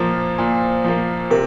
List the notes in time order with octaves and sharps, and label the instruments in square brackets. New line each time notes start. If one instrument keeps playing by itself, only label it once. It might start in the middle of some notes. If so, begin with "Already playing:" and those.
Already playing: [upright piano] A#2 F3 A#3 [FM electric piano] C5
[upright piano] A#2
F3 A#3
[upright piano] C3 [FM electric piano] A#4